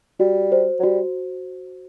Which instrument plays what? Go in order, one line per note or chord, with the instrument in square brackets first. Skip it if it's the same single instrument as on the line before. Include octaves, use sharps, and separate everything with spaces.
[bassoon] G3 [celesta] F#4
[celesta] C5
[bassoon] F#3
[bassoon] G3 [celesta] F#4